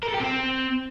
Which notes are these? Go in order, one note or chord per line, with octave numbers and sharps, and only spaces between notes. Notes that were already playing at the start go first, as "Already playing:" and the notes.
A#4
A4
G4
C4